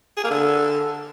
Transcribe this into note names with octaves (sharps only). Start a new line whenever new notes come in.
G#4
A#3
D3